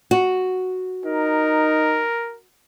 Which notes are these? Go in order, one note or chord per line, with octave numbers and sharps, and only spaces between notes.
F#4
D#4 A#4